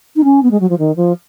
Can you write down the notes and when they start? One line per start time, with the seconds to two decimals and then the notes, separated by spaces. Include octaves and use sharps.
0.15 D#4
0.24 C#4
0.42 B3
0.51 G#3
0.60 F#3
0.69 F3
0.78 D#3
0.96 F3